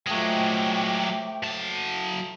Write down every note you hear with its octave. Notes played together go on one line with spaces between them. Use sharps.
F3 F#3 G#3 A3 G5 D6
F#3 A5